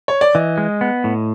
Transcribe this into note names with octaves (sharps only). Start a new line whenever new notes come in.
C#5
D5
E3 D#5
G#3
B3
A2